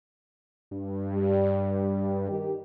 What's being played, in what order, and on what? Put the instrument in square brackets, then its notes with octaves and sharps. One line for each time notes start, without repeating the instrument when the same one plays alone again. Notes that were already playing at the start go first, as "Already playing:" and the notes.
[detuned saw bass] G2
[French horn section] G3
D#3 G4